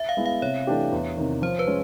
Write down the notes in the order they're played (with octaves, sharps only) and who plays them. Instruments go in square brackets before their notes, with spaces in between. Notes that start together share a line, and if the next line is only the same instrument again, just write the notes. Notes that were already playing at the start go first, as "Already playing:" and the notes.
Already playing: [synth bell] E5
F5
[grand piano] G#3 B3 E4
[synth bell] F5
[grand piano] C3 [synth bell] C#5
[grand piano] E3 A3 D4 G4
E2
C3 D#3
[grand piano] F3 [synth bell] C5
[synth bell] B4
[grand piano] G#3 C#4 F4